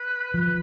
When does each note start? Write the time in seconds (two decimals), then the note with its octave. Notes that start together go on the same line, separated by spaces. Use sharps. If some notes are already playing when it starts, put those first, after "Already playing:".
Already playing: B4
0.34 F3